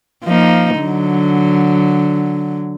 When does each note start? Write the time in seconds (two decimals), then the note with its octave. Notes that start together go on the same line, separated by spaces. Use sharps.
0.24 F3 A#3 D#4
0.79 D3 F#3